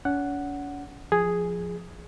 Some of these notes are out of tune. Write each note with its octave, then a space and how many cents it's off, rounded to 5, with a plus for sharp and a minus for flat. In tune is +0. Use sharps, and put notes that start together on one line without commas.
C#4 +40 F#5 +0
F3 +5 G#4 +0